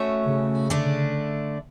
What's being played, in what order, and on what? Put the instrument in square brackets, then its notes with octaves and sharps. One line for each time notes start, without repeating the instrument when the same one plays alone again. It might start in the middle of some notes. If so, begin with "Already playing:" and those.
Already playing: [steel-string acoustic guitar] A3 C#4 F#4 C#5 E5
[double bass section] C#3
[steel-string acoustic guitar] D3 A3 D4